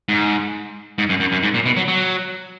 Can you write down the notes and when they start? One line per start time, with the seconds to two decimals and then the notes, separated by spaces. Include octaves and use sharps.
0.09 G#2
0.98 G#2
1.09 F#2
1.20 F#2
1.32 F#2
1.43 G#2
1.54 A#2
1.66 B2
1.77 F#3
1.88 F#3